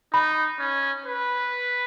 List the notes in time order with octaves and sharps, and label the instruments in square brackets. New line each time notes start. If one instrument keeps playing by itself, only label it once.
[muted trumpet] D#4 [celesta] B5
[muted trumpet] C#4
B4